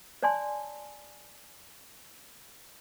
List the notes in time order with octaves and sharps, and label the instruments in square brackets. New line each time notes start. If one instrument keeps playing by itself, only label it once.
[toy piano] C#5 D5 G#5 A5 C6